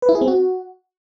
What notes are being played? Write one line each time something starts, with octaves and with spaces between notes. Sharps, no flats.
B4
E4
G#4
C4
F#4